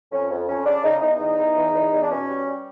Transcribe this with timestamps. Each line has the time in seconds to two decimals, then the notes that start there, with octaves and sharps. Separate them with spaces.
0.11 F2 C#4
0.30 F2
0.47 F2 C#4
0.65 C#3 D4
0.83 C#3 D#4
1.01 E2 D#4
1.19 E2
1.38 E2
1.56 E2
1.73 E2
1.91 E2
2.02 D4
2.09 B2 C#4
2.27 G3
2.46 G3